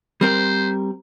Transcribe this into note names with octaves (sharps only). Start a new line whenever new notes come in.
G3 C4 A#4 C5